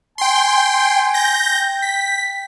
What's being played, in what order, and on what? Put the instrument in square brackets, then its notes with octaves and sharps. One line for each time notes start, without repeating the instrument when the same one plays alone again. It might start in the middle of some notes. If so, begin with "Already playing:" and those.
[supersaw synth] G5 C6 [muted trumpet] G#5
[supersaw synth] G6 A#6
[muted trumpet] G5
[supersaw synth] B6